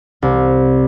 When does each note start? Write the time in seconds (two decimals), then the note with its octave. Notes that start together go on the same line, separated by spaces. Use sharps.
0.22 C2